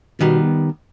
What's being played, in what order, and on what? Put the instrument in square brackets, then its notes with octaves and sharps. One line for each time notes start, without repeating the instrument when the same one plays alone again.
[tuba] B2 [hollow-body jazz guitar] D#3 G3 B3